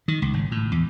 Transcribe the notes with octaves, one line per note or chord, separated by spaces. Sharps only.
D#3
C#2
G#1
A2
E2